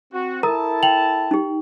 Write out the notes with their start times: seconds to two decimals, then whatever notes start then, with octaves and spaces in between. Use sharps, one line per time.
0.13 C4 F#4
0.43 E4 A4 A#4 A5 A#5 D#6
0.83 G5 F7 F#7
1.31 D#4 G4